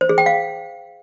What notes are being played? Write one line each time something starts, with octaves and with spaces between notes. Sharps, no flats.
C5
G#4
G5
F5